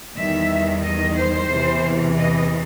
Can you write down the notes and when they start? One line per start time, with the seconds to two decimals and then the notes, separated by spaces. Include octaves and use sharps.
0.17 E2 D#3 G3 E5
0.83 D#5
1.16 C5
1.49 E2 C3 E3
2.16 D#5